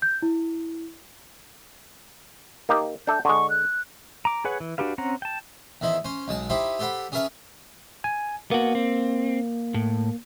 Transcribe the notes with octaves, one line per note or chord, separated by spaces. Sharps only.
G6
E4
A#3 D#4 G4
D4 A4 E5 G6
D3 G#3 C#6
F#6
A#5 D6
G#4 B4 C#5 F#5
E3
D4 F#4 G4 B4 F5
C4 C#4 F#5 A#5
G5 A5
E2 D#3 E4 C5
C#4 C5
B1 G#3 A5
D#4 E4 G4 C5 B5
G4 A4 C5 F#5 B5
C#4 G#4 A#4 B4 E5 A5
G#5
A#3 B3 F#4
C4
A2